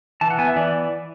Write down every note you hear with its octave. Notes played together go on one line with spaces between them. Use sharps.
E3 A5
F#5
B3 G#5
E5
E3 D5